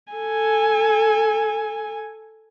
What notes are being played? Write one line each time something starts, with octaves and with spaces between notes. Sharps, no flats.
A4 G#5